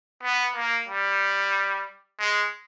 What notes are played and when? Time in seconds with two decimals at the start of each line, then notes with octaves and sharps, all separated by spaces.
0.23 B3
0.55 A#3
0.88 G3
2.19 G#3